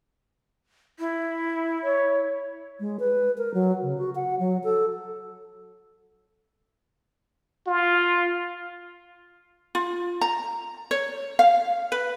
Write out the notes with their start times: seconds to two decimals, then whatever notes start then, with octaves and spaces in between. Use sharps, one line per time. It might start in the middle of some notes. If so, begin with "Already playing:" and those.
0.99 E4
1.83 C#5
2.80 G#3
3.00 B4
3.38 A#4
3.54 F#3
3.83 C#3
3.98 F#4
4.15 F#5
4.40 F#3
4.64 A4
7.67 F4
9.75 F4
10.21 A#5
10.91 C#5
11.39 F5
11.92 B4